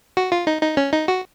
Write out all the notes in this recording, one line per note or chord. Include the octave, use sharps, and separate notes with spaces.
F#4
F4
D#4
D#4
C#4
D#4
F#4